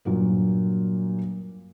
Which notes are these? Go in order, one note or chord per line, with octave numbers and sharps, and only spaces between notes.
G2 A#2 F#3 A#3